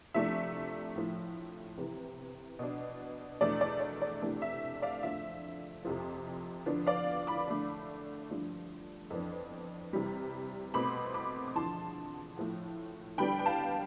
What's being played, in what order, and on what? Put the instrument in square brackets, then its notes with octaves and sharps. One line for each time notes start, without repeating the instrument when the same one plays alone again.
[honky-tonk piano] C3 F3 A3 D4 E5
A2 F3 A3
C3 E3 B3
B2 B3 D4
E2 B2 A3 D4 D5
D5
D5
D5
C3 E3 A3 D4
E5
D5 F5
F2 D3 F3 A3 E5
F2 C3 F3
D3 F3 B3 D4
D5 F5
B5 D6
D3 A3 D4
G2 F3 A3 D4
F2 E3 B3 D4
C3 E3 G3
B2 A3 C4 B5 D6
B5 D6
D6
E2 D3 F3 A5 C6
A2 F3 A3
D3 G3 B3 D4 G5 B5
G5
F5 A5